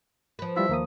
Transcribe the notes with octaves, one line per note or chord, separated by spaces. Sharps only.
F3 B4
G3 E4 F4 E5
D#2 A#3 D#6